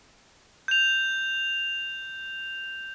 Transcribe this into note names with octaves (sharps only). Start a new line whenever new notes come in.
G6 F7